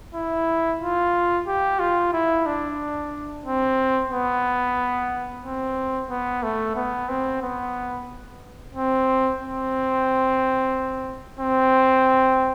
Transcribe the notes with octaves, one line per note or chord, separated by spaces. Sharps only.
E4
F4
G4
F4
E4
D4
C4
B3
C4
B3
A3
B3
C4
B3
C4
C4
C4